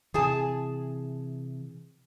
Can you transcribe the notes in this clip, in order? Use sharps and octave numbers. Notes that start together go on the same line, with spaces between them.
C3 E3 G#4 G#5 A5